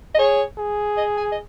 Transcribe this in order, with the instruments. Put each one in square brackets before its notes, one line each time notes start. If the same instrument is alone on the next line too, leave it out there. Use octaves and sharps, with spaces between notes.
[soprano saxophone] D#5
[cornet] G#4 [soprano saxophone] C#5
[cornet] G#4
[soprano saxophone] D#5
G#5
D#5